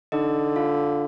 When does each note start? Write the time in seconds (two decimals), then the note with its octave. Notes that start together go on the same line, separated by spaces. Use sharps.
0.12 D3 D#4 D#5
0.56 F4 F5